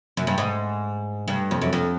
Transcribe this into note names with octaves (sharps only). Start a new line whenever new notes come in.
F#2
G2
G#2
G2
F2
F#2
F2